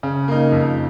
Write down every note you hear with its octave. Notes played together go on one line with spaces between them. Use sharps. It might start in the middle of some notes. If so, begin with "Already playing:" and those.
C#3
A#3 D#4
F2